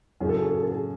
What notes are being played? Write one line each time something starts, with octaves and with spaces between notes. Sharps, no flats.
F#2 C#3 F#3 C#4 G#4
A4
G#4
A4
G#4
A4
G#4